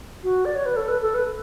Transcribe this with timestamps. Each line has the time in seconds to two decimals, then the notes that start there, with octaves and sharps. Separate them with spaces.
0.23 F#4
0.45 D5
0.55 C#5
0.66 B4
0.76 A4
0.88 B4
1.02 A4
1.14 B4